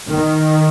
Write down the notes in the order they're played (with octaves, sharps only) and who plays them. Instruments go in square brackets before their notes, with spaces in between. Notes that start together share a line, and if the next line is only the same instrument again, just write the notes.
[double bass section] D#3